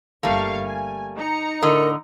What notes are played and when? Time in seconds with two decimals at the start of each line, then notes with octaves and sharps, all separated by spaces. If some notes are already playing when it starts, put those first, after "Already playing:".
0.23 G1 G3 A3 A#3 F5 C#6
0.65 G#5
1.16 D#4 A#5 C#7
1.62 A2 D3 A#4 D#5